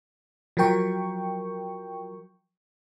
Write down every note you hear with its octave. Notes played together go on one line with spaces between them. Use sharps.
F3 F#3 A#4 G5 C#6